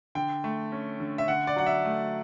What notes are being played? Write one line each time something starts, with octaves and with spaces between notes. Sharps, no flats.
D3 G5
A3
C#4
D3
E5
D3 F#5
D5
F#3 F#5
E5
A3